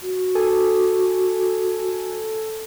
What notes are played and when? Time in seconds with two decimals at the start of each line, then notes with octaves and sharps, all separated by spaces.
0.02 F#4
0.35 A4 G#5